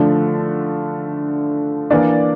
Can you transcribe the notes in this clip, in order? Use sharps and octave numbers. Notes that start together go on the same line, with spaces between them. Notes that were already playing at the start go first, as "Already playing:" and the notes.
Already playing: D3 F3 A3 D4
E3 A#3 D4 D5